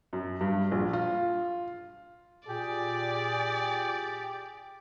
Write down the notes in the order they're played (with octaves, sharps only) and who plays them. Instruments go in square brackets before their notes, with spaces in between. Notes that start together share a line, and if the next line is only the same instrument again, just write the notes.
[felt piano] F#2
G2
A#1
F4
[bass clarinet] A#2 [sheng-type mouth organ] G4 [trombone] G#4 [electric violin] D5